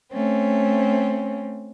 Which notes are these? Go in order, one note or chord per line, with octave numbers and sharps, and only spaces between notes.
A3 C4 C#4